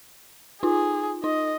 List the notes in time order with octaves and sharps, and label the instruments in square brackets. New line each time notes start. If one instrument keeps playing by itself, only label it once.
[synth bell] D#4 F4 [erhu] G#4
[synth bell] D#4 [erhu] D#5